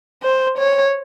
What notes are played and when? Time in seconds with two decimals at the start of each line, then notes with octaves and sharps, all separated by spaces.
0.23 C5
0.58 C#5